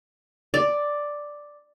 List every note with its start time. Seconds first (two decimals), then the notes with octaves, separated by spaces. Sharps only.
0.54 D5